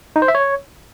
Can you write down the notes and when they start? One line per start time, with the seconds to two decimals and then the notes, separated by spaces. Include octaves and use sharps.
0.16 D#4
0.22 C5
0.28 E5
0.35 C#5